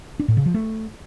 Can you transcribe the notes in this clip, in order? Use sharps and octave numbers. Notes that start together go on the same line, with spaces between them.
D4
A2
C#3
F3
A3